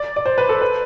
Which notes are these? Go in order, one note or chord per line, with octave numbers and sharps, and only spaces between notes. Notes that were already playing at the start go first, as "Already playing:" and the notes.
Already playing: D5
D5
C5
B4
A4
B4